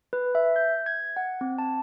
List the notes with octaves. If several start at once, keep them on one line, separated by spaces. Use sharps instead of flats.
B4
E5
G6
G#6
F#5
C4
A5